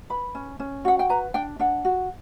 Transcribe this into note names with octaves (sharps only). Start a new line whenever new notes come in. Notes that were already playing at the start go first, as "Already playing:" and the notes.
B4 B5
C#4
C#4
F#4 F#5
G5
B4 A#5
D4 G5
D4 F#5
F#4